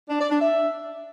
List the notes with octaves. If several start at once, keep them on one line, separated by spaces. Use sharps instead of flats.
D4
D5
D4
E5